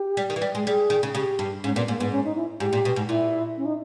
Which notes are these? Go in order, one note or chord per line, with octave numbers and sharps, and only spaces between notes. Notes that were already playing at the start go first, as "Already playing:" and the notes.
Already playing: G4
G3
D#3
E3
G3
G#3
G3 G#4
D#3
C#3
C#3 G4
G2
G#2 C#4
A#2 B3
G#2 A#3
G#2 B3
C#4
D#4
E4
G#2 G4
A#2
B2
G#2
A#2 E4
C#4
D#4